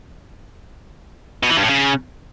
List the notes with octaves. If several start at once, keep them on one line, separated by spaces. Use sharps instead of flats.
B2
E3
G2
A2
C#3